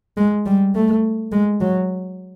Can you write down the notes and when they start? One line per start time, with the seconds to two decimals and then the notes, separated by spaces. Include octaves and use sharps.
0.17 G#3
0.46 G3
0.75 A3
1.32 G#3
1.61 F#3